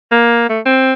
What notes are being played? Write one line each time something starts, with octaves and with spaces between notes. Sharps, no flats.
A#3
A3
C4